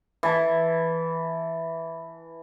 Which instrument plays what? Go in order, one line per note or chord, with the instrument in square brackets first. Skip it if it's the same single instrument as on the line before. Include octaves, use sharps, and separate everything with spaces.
[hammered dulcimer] E3 A5